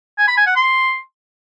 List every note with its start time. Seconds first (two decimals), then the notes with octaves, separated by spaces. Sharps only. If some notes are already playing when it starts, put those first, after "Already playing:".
0.18 G#5
0.28 B5
0.37 G#5
0.46 F#5
0.56 C6